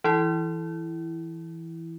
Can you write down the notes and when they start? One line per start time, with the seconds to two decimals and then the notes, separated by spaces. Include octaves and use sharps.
0.04 E3 E4